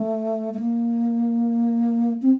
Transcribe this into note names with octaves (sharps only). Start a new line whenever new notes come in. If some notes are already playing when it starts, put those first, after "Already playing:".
Already playing: A3
A3
A#3
C4